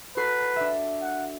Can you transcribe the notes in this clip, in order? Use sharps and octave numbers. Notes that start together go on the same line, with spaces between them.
F#4 A4 B4 C7
D4 E5
F#5